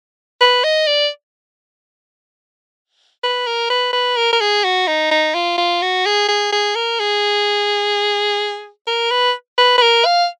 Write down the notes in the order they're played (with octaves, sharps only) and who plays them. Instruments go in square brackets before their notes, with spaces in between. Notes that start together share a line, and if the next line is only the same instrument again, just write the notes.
[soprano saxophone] B4
D#5
D5
B4
A#4
B4
B4
A#4
A#4
G#4
F#4
D#4
D#4
F4
F4
F#4
G#4
G#4
G#4
A#4
G#4
A#4
B4
B4
B4
A#4
F5